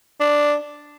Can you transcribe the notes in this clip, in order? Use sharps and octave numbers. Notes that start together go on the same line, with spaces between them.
D4